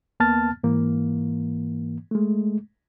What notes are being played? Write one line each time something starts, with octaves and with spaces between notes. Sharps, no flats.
D#2 A#3 B3 A5 F6 A6
G#2 E3 A#3
G#3 A3